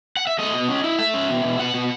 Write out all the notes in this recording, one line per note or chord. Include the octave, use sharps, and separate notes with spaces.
F#5
E5
A3 D#5
B2
C#4
E4
A3 E5
C#4
B2
B2
B2 F#5
B2